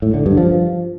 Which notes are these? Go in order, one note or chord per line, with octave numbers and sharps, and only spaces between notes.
A2
D3
G2
F3